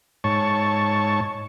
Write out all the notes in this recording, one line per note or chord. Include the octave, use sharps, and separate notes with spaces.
G#2 C#5 A5 C#6